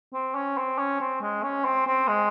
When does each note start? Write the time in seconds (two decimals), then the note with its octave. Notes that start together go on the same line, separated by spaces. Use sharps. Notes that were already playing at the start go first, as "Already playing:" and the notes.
0.13 C4
0.35 C#4
0.57 C4
0.78 C#4
1.00 C4
1.21 G#3
1.43 C#4
1.65 C4
1.87 C4
2.08 G#3